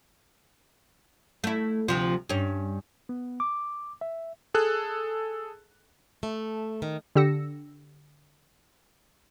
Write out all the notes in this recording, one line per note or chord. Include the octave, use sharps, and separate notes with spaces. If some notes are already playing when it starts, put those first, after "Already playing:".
A3 E4
D2 C3 F3
G2 C#4
B3
D6
E5
G#4 A4 F#6
A3
D#3
D3 G4 E6 A#6 C#7